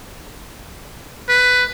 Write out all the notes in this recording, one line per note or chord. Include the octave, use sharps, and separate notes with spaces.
B4